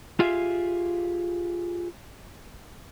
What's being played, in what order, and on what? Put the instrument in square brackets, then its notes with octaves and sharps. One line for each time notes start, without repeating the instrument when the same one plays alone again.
[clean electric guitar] F4 G4 G#4 E5 F5